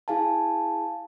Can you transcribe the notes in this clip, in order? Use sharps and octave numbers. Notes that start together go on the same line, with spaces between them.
E4 G#4 F5 G#5 A5